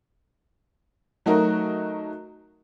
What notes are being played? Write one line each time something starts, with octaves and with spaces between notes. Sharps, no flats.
F#3 A3 D#4 F#4 A#4